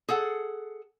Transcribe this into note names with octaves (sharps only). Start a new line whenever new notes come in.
G#4 A4 F#5